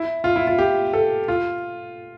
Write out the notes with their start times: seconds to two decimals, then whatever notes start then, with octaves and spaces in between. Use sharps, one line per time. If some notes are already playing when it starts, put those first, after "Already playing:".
Already playing: E4
0.24 F4
0.36 E4
0.47 F4
0.58 G4
0.93 A4
1.28 F4